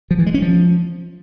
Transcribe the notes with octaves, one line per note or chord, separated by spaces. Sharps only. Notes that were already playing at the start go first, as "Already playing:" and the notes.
F3
E3
G#3
C#4
F3